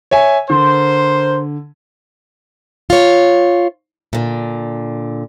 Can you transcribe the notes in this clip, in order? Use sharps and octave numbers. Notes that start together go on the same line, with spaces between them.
C#5 E5 G#5
D3 A#4 C5
F4 C#5
A#2 D3